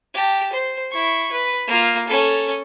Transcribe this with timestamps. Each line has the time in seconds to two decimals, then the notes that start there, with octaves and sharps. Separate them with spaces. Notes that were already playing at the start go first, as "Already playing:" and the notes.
0.14 G4 A5
0.53 C5
0.92 E4 C#6
1.32 B4
1.68 A#3 F4
2.08 C#4 A4